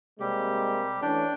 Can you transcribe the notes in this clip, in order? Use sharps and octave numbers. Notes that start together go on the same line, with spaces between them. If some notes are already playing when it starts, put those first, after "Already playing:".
C3 G3 G#3 A#3 G4
E3 A3 C#4 D4 G5